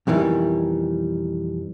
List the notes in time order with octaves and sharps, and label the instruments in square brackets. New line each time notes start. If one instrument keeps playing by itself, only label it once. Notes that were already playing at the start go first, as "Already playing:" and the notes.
[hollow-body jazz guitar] F2 B2 D#3 E3 G3